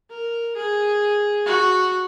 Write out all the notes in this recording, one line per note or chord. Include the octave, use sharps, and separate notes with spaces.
A#4
G#4
F#4